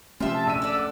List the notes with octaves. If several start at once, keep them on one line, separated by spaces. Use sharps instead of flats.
C3 F3 A3 C#4 F4 E5 G5
A5
A#1 E6 D#7
A4 D5
F#5 D6